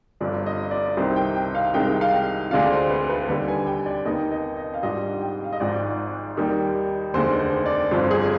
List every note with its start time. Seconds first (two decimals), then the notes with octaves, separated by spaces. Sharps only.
0.20 G1 G2 F3 D5
0.46 D#5
0.71 D5
0.97 C2 C3 D#3 C5
1.16 G5
1.35 G5
1.55 F5
1.74 C2 C3 D#3 G#3 G5
2.01 F5
2.13 G5
2.51 D2 D3 G#3 D4 F4 F5
2.71 C5
2.90 B4
3.09 B4
3.28 D#2 D3 G3 B4
3.48 G#5
3.67 G5
3.86 D5
4.05 D#2 D#3 B3 D#5
4.32 D#5
4.56 D#5
4.74 F5
4.83 G#2 G3 D4 F4 D#5
5.21 G5
5.44 F5
5.53 D#5
5.60 G#1 G#2 F3 D5
6.37 D#2 D#3 G3
7.14 F1 D#2 D3 G#3 C5
7.40 C5
7.66 D5
7.91 G1 G2 F3 C4 C5
8.11 G#4